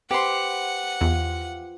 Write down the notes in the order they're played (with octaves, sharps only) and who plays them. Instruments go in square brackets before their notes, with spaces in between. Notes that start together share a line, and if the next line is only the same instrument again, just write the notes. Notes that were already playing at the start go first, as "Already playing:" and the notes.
[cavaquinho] G4 C6 [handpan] B4 C5 [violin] F#5
[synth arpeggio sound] E2 [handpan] F4